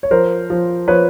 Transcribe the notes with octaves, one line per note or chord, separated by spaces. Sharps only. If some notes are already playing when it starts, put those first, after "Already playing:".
C#5
F3 A#4 C5
F3
F3 B4 C#5